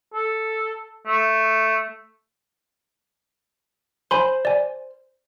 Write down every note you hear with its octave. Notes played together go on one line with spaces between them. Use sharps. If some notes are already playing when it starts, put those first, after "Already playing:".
A4
A3
C5 G#5 B5 C6
D5 G#5